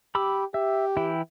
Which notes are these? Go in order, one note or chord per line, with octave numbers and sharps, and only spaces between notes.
G4 B5 D6 E6
G4 E5
E3 E4 G5